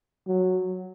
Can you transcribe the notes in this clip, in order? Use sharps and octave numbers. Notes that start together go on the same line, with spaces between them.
F#3